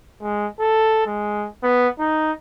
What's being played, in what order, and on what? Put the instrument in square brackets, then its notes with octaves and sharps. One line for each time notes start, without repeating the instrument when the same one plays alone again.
[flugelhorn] G#3
A4
G#3
B3
D#4